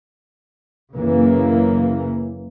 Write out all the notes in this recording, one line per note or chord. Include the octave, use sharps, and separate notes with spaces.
F#1 C#3 E3 A#3